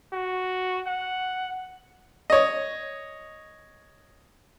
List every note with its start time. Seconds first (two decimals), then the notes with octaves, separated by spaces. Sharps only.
0.13 F#4
0.87 F#5
2.30 C#5 D#5